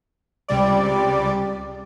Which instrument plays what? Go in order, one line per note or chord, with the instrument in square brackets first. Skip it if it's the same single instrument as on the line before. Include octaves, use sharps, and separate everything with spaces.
[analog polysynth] C#2 C3 G3 D5